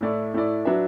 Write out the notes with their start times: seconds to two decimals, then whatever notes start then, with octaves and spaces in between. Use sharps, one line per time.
0.01 A2 A3 E4 D5
0.34 A2 A3 E4 D5
0.65 F#3 D4 B4 E5